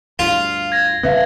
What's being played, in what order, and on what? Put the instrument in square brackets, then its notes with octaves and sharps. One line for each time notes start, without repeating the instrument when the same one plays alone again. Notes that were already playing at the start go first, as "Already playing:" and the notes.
[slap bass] D2 G2 [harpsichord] F4
[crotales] G#6 A#6
[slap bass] G1 C#3 B3 [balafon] B4 E5 F5